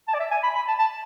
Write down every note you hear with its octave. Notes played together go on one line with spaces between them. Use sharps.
A5
D5
E5
G#5
B5
B5
A5
A5